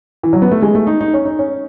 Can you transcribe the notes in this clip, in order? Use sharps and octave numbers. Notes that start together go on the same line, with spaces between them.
E3
F#3
B3
A3
G#3
A3
D#4
D#4
C#4
D#4
C#4